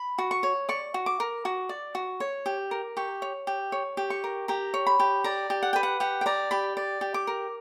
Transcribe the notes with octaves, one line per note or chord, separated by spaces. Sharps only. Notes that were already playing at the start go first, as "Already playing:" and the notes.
Already playing: B5
F#4
C#6
C#5
D5 C#6
F#4
D6
A#4
F#4
D5
F#4
C#5
G4
A#4
G4 C#6
C#5
G4
C#5
G4
C#6
A#4
G4 A#5
C#5
B5
G4
D5 A#5
G4
F#5
B4 G5
F#5
G4 F#5
G5
D5 A#5
G4 B5
D5
G4
D6
A#4